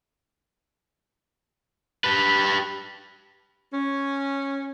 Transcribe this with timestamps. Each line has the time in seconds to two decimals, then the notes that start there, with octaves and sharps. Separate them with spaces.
2.04 G4 B4
3.74 C#4